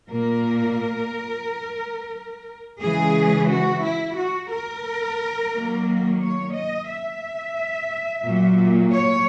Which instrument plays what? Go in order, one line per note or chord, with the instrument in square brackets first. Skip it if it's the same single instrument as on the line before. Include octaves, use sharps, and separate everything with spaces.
[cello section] A#2 A#3 A#4
C#3 E3 G#3 G#4
F#4
E4
F#4
A#4
D#3 F#3 A#3
C#5
D#5
E5
A#2 F#3 A#3
C#5